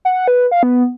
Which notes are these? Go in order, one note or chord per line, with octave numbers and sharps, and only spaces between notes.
F#5
B4
F5
B3